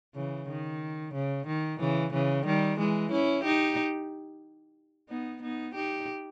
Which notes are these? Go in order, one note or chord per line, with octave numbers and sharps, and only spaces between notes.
C#3 E3
D#3
C#3
D#3
C#3 E3
C#3 E3
D#3 G3
E3 G#3
C#4 E4
D#4 G4
B3 D#4
B3 D#4
D#4 G4